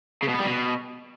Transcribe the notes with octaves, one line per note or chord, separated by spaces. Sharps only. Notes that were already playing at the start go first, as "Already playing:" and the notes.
C#3
B2
B3
G3
B2